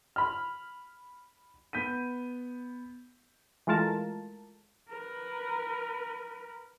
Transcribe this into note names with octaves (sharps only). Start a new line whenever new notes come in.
B5 F6
B3 G6 B6 D#7
E3 G#3 A3 F4 A#4 A5
A#4 B4